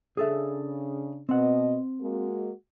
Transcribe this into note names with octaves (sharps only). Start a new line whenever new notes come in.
C#3 D4 G#4 A4 E5
B2 C4 D#5 F#5
G#3 A#3 F#4